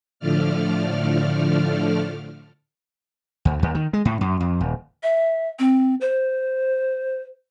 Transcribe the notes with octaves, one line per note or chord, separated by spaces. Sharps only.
A2 D3 F3 A3 D5 F6
D2
D#2
D#3
G#3
A2
F#2
F2
D#1
E5
C4
C5